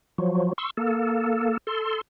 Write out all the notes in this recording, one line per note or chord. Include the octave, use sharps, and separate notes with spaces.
F3 F#3
C6 C#6 E6
A#3 A4
A4 C6